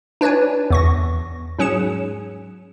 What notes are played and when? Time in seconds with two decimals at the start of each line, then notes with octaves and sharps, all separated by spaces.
0.21 D4 B4 C#5 D5 G#5
0.71 E2 C#6 A#6
1.59 G#2 F#3 C#4 G#4 C#7 E7